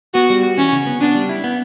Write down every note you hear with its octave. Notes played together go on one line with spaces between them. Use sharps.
B3 F#4
G3
F#4
E3 C#4
C#3
B3
B3 D4
G3
E4
B3